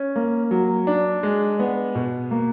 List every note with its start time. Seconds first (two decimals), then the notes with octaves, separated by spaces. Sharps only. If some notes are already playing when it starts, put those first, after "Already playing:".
Already playing: C#4
0.16 A#3
0.51 F#3
0.87 D4
1.23 G#3
1.59 B3
1.95 B2
2.31 A#3